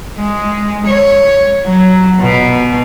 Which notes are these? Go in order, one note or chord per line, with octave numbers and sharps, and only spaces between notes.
G#3
C#5
F#3
B2